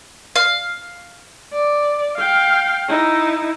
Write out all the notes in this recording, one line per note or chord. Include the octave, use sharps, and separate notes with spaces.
F5
D5
F5 G5
D#4 E4